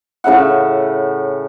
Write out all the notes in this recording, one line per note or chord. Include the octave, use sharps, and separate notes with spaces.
A2 C#3 E5 F#5